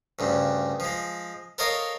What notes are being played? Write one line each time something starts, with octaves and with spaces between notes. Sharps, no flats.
D2 G2 C#3
F3 G#3
A4 A#4 C5 C#5 D#5 F5